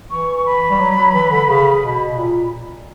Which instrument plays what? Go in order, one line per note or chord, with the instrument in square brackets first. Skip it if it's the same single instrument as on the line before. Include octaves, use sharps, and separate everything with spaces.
[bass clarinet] E3 [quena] C#6
[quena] B5
[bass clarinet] G3
F#3
F#3
E3
D3
C#3
B2
A#2